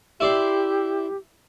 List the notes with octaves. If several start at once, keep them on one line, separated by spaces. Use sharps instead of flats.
E4 G4 D5 C6